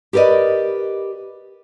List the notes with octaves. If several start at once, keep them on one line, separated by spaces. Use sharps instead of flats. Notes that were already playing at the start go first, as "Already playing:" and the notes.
G4 A#4 B4 D5 D#5